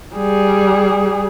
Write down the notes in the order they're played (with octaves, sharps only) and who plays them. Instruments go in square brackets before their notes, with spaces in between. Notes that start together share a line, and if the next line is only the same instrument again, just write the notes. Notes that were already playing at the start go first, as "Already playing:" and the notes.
[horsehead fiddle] G3 G#4